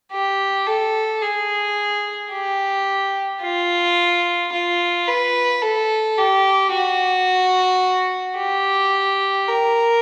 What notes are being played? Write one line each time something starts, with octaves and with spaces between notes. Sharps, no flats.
G4
A4
G#4
G4
F4
F4
B4
A4
G4
F#4
G4
A#4